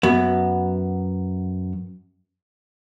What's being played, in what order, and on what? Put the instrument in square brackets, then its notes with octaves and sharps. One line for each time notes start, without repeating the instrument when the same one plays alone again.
[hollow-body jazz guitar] F#2 B3